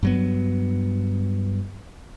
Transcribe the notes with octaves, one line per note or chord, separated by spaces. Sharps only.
G2 F#3 B3